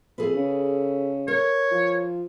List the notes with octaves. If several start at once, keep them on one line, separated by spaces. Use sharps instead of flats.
F2 G#4 A4 B4
C#3
A#4 C#5
F3